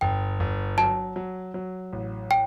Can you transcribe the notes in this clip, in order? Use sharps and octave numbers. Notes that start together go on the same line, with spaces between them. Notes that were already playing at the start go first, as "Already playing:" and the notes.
G1 G5
G1
F#3 A5
F#3
F#3
A1
G5